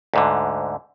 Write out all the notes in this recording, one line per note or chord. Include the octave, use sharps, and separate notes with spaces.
D2 G#2 D3